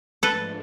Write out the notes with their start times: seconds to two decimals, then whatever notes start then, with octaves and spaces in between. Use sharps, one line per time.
0.23 G#2 F3 A3 D4 A4 B4